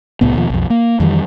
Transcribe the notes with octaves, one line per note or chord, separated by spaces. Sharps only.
C2 A2 B3
D#2 B2 F3
B1 F2
A#3
F2 D#3 E3 G3